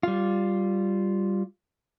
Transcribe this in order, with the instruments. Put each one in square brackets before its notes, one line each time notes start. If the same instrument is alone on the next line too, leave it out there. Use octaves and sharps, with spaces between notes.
[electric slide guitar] G3 F4